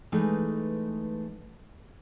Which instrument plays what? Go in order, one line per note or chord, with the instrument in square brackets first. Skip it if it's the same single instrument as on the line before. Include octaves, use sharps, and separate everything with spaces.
[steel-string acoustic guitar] E3 G#3 A3 D#4 B4